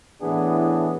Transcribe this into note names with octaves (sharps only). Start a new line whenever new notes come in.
A2 E3 B3 D4 G#4